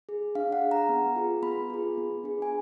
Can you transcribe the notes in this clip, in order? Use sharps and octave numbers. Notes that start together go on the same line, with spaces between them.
G#4
D4 F5
F#5
G#4
A#5
B3
F4 G#4
B3 B5
F4 G#4
B3
D4 G#4
G#5